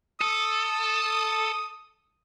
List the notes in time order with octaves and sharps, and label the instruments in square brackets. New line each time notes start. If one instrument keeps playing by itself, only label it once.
[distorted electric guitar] A4 [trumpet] D#6